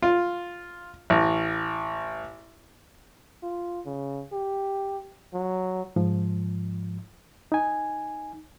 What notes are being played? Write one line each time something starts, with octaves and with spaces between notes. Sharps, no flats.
F4
A1
F4
C#3
G4
F#3
G#2 F3
D#4 G#5